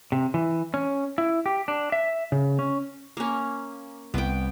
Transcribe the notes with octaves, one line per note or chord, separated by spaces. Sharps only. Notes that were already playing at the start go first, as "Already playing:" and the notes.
C3
E3
C#4
E4
G4
D4
E5
C#3
C#4
A#3 C#4
C2 B3 G5